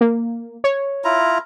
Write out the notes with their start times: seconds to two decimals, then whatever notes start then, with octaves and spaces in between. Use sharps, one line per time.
0.01 A#3
0.64 C#5
1.04 E4 F4 A#5